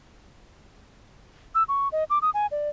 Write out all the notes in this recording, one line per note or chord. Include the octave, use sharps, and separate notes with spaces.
E6
C#6
D#5
D6
D#6
G#5
D5